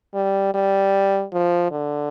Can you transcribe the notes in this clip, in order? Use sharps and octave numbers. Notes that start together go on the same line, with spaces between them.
G3
G3
F3
D3